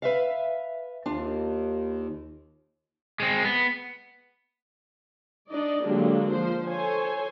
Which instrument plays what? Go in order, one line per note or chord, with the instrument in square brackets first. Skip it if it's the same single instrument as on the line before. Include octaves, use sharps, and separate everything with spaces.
[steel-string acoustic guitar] B4 E5 F5
[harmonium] D#2 [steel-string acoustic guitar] D4 F4
[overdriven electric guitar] G#3 C4
B3
[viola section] D4 D#4 D5 D#5
D3 F#3 G#3 A#3 D4 G4
F3 C5
A4 C5 C#5 G#5